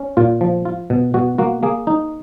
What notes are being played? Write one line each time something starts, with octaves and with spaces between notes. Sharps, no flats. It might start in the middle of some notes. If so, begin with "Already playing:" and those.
Already playing: C#4
A#2 F4
F3
F4
B2
B2 F#4
A#3 F#4
A#3 G#4
D#4